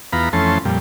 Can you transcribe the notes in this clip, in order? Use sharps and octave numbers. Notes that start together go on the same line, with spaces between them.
E2 B3 F4 A#5 B5
F2 E3 A3 C#4 A5 C6
F2 A#2 G3